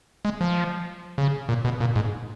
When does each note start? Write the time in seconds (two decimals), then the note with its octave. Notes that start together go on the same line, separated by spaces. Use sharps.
0.25 G#3
0.41 F3
1.18 C#3
1.49 A#2
1.65 B2
1.80 A#2
1.96 G#2